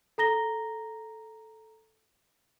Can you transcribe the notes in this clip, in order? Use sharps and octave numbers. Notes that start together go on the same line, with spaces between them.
A4 A#5 A#6 G7